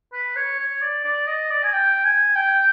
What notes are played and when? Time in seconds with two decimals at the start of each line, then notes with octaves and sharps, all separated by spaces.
0.13 B4
0.36 C#5
0.59 C#5
0.82 D5
1.04 D5
1.27 D#5
1.51 D5
1.63 G#5
1.73 G5
2.05 G#5
2.35 G5